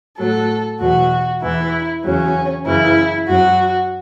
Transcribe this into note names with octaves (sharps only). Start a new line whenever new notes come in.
A2 F#3 A4
E2 B2 F#3 F#4
E2 E3 E4
E2 C#3 F#3 C#4
F#2 C#3 E3 E4
F#2 F#3 F#4